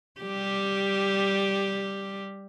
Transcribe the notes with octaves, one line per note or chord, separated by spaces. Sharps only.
G3 G4